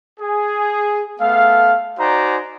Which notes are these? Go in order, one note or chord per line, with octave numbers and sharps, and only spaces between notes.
G#4
A3 B3 A4 F5
D#4 F#4 C5 D5 G#5 A#5